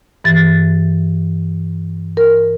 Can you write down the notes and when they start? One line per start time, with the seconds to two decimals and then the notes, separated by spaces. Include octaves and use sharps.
0.24 G2 E3 A6
2.17 A#4